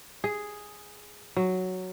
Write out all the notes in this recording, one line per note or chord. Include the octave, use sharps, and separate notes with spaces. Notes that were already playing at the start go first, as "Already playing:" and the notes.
G#4
F#3